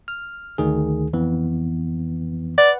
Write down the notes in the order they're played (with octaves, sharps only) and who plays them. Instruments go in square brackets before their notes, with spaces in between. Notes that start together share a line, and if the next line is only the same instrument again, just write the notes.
[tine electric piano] F6
D2 D#3 G#4
F2 E3 B3
[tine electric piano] B4 F#5 [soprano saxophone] D5